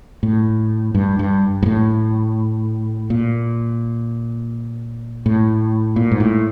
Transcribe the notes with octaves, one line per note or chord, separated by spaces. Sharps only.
A2
G2
G2
G#2
A2
A#2
A2
A#2
G#2
A2